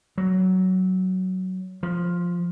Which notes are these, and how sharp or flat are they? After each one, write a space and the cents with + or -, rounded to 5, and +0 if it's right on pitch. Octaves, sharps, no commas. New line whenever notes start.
F#3 +10
F3 +5